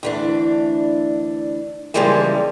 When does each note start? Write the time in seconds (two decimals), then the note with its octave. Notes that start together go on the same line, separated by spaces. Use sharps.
0.03 D2 E3 D4
1.94 C#3 E3 F3 G3 G#3 A#3